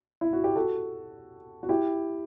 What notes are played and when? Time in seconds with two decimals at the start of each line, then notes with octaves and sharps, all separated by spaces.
0.21 E4
0.33 F#4
0.44 G4
0.56 F#4 A4
1.63 F#4
1.69 E4 G4